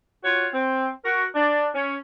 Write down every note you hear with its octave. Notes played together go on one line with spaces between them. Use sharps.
F4 F#4 C#5
C4
F#4 A#4
D4
C#4